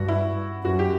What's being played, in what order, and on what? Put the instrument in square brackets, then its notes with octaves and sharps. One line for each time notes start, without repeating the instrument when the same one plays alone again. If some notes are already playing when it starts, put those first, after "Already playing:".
Already playing: [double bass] G2 [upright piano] F#4
[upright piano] E4
[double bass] F#2 [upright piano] F#4
[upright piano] G4